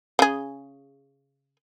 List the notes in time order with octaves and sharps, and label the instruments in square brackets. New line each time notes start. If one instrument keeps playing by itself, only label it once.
[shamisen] C#3 G#4